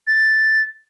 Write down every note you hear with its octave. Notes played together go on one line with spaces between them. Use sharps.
A6